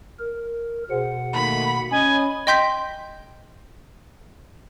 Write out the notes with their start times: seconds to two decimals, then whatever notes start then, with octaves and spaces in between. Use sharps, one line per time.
0.19 A#4
0.90 B2 G#4 C5 F#5
1.34 D#3 A3 A#3 B5
1.91 C#4 D#5 G#5 B5
2.47 D#5 G5 C6 G6 B6